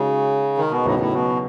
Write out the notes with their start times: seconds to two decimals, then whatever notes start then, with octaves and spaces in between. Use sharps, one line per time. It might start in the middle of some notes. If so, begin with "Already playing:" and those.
Already playing: C#3 G#3 D#4 F#4 C#5
0.58 D#3
0.71 B2
0.85 E2 A2 C#3 F#3 B3 D#4
0.99 A2
1.14 B2